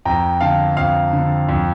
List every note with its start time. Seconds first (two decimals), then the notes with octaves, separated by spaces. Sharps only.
0.05 F2 G5 A#5
0.41 D3 F5 A5
0.77 F2 F5
1.13 D3
1.49 F2